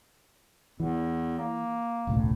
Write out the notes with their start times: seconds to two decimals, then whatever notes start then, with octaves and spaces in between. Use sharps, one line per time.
0.80 E2 E3
1.38 A#3
2.07 E1 C#2 A2